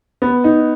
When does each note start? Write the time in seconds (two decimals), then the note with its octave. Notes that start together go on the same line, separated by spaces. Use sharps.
0.22 B3
0.44 D#4